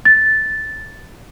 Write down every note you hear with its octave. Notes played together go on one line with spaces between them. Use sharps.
A6